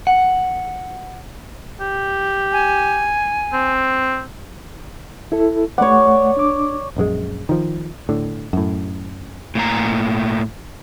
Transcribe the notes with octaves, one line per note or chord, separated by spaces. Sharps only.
F#5
G4
G#5
C4
E4 A4
A3 C#5 D5 F#5
D4 D6
A#1 F#2 D#3 G#3
D#3 F3
A2 D3
F#2 A2
A2 A#3 A#5